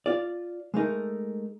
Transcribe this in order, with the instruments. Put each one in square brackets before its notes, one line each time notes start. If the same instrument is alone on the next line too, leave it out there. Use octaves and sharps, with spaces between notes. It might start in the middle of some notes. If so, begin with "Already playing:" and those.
[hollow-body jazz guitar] F4 D5
G#3 A3 D#4 A#4